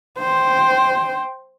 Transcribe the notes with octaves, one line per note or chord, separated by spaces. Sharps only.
C5 G5